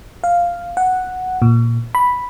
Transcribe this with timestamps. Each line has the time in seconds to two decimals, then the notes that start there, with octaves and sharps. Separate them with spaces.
0.24 F5
0.77 F#5
1.42 A#2
1.95 B5